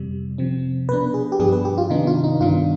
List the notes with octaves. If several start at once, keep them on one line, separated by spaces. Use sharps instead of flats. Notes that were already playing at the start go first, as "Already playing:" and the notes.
Already playing: F2 C3 G3
C3 F3 C4
B2 B3 D4 B4
G#4
G4
G2 F3 B3 D4 G#4
B4
G4
F4
C3 D#3 B3 D4 D#4
F4
D#4
G2 D#3 B3 D4 F4